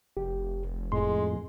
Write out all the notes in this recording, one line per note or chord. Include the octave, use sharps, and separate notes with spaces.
F1 G4
F2 A2 G#3 C6